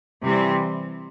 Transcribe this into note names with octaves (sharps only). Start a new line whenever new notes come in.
C3 E3 G3 C4